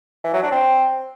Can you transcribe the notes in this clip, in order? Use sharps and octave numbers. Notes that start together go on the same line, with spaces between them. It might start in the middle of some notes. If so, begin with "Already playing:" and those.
E3
F#3
D4
C4